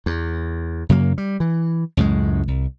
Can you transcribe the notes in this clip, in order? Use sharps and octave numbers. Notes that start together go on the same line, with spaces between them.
E2
F#2 C#3 F#3 A#3
G3
E3
C#2 F#2 A2 G#3
C2